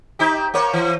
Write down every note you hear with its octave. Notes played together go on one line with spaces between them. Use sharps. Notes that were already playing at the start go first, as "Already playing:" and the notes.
C4 D#4 G4
A#3 C4 C#5
E3